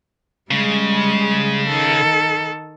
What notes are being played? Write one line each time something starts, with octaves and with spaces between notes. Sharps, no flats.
C#3 G3 G#3
D#3 A4